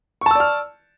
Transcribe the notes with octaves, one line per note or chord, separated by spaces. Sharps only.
D5 A5 C#6 E6 F6